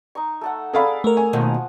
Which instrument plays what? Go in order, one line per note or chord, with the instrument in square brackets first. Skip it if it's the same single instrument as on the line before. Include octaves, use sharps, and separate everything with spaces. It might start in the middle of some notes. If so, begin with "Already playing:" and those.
[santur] D#4 A#5 C#6
A3 A4 F#5
[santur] G#4 D5 [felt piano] A4 F5 B5
[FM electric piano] A3 A#4 [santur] C#6
[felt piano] G#5
[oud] D#2 B2 D#3 [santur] F3 F#5